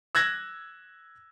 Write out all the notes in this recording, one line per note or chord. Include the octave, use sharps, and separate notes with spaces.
E6 F#6 G#6 A#6